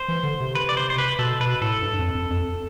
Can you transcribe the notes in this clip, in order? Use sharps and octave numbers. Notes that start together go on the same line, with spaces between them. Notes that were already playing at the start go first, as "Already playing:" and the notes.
Already playing: C5
E3
D3
C3
B4
D5
C5
C5
B4
B2 A4
B2 B4
A2 A4
G2
F2
F2
F2